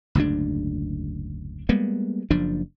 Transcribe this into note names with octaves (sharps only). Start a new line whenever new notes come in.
F#1 D2 G#2 D4
G3 G#3 A#3 B3
F#1 F3 D4